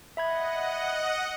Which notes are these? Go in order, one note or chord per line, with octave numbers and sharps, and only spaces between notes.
D#5 E5 F#5 B5 G#6